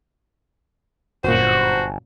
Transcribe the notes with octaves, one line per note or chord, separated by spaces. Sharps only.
G1 F#2 A#2 F#4 C5